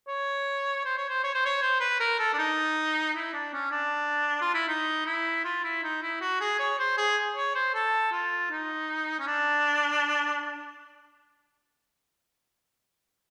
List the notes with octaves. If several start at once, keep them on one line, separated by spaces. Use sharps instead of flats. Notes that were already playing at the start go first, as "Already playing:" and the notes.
C#5
C5
C#5
C5
C#5
C5
C#5
C5
B4
A#4
A4
D4
D#4
E4
D4
C#4
D4
F4
E4
D#4
E4
F4
E4
D#4
E4
F#4
G#4
C#5
C5
G#4
C#5
C5
A4
F4
D#4
C#4
D4